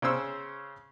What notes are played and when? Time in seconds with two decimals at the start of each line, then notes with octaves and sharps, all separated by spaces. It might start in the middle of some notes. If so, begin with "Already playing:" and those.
0.02 C#3 C#4 C5 E6